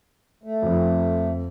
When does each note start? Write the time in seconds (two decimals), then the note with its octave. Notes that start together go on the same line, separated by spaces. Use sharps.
0.43 A3
0.62 F2